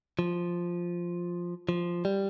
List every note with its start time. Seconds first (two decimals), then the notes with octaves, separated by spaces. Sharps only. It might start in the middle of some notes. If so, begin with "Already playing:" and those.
0.19 F3
1.69 F3
2.05 G3